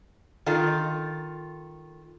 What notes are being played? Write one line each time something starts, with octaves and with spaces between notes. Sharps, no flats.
D#3 F4 A4